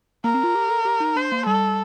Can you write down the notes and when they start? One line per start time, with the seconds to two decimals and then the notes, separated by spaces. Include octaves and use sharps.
0.24 A#3 A#4
0.34 C4
0.44 F4
0.55 G4
0.69 A4
0.85 G4
1.00 D#4
1.16 D4 C5
1.32 A#3
1.46 G3 A4